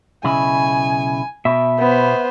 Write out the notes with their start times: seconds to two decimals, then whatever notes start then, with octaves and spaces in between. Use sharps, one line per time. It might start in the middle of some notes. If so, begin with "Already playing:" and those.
0.24 B1 C#3 E4 G#5
1.45 B2 E5
1.79 B3 C5